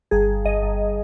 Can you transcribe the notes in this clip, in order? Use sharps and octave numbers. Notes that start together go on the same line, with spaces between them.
G1 G#4
G1
G1 D#5
G1